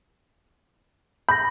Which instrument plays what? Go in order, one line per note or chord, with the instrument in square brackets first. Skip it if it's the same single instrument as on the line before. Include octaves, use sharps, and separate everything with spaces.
[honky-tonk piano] B5 [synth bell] G6 A#6